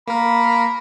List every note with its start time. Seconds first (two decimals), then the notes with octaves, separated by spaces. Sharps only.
0.08 A#3 A#4 B5